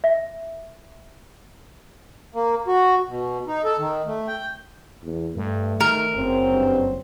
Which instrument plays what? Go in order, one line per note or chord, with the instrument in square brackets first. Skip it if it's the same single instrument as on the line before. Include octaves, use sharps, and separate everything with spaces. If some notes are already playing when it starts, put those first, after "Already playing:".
[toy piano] E5
[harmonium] A#3
F#4
B2
D#4
A4
D#3
A3
G5
[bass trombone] E2
[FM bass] G2 [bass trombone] A3
[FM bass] D#3 [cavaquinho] A#4
[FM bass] F#1 [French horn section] C#3 F#3 C4
[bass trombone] G2